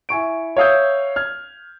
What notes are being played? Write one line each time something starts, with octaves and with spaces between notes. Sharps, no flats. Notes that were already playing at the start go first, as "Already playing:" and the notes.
E4 G#5 C#6 D7
C#5 E5 F5 D#6 E6 G6
F6 G#6